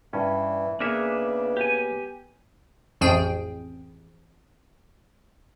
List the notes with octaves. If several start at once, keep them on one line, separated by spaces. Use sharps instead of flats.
G2 E3 C#4
C#3 A#3 B3 D4 G#4 C#5 E5
G4 G#5
A1 F2 G#4 G5